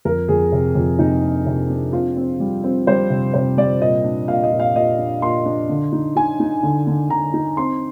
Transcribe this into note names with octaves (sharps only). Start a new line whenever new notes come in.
F2 A#4
F2 G#4
C3
F2
C3 D#4
D4
C3
D4
C4 F4
C4
G3
C4
G3 C5
C3
C3 C5
G3 D5
A#2 D#5
D4
A#2 F5
D#5
A#2
F5
A#2 D#5
D4
A#2 C6
D4
D3
D#4
D#4 G#5
D#4
D3
D3
D3 A#5
D#4
C4 C6